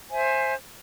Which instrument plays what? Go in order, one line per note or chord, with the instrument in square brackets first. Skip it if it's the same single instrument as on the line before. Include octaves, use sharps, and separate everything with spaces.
[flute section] C5 E5 G#5